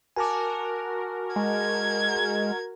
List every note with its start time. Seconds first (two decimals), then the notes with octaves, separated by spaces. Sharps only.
0.16 F#4 A#4 G#5 A5 D6
1.36 G#3 G#6